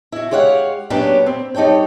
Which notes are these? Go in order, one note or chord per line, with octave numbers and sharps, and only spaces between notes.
E4 F#4
G#3 G4 C#5 F5 F#5
F#3 A#3 B3 C#4 D4 G4
C4
G3 D#4 A4 C#5 G5